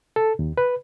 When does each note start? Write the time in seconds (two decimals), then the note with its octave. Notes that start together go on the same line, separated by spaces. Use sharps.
0.16 A4
0.39 D#2
0.57 B4